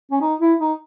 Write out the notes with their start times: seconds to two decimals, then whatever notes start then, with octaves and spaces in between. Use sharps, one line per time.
0.11 C#4
0.21 D#4
0.41 E4
0.59 D#4